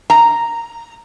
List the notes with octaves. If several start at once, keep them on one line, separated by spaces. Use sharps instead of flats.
A#5